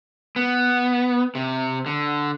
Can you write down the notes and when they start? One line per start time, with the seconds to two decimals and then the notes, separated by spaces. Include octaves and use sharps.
0.36 B3
1.35 C3
1.86 D3